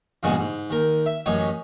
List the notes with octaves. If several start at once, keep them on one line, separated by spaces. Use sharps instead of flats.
E2 G2 A#2 C#3 G#3 B3
G#2
D#2 A#4
E5
A1 F#2 D#4 C#5